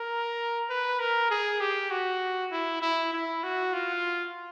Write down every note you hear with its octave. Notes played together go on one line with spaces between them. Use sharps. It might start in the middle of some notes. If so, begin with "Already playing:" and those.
Already playing: A#4
B4
A#4
G#4
G4
F#4
E4
E4
E4
F#4
F4